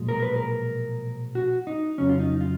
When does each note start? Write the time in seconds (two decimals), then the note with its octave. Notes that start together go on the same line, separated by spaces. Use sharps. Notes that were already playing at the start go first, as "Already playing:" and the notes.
Already playing: B1 A#2 F3 G#3
0.09 A#4
0.23 B4
0.36 A#4
1.35 F#4
1.67 D#4
1.98 F2 C#3 F#3 C#4
2.09 F4
2.20 D#4
2.41 F4